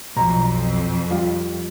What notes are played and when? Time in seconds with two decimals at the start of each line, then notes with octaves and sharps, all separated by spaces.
0.16 B1 F2 B2 A#5
1.11 G3 F4